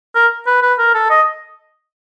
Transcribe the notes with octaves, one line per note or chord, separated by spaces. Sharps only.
A#4
B4
B4
A#4
A4
D#5